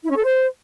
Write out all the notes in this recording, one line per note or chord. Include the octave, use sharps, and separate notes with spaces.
E4
C#4
A4
C5